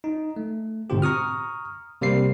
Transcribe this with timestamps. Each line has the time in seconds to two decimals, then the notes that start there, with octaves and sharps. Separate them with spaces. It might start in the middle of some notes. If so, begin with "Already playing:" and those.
0.04 D#4
0.37 A3
0.90 G#2 B2 D3 C4 F4 G4
1.02 A#5 C#6 D#6 F6
2.01 C3 G3 A#3 C5 C7